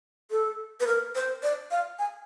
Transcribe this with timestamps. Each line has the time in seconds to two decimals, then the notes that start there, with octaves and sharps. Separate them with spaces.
0.31 A4
0.80 B4
0.87 A#4
1.15 C5
1.43 D5
1.71 F5
1.99 G#5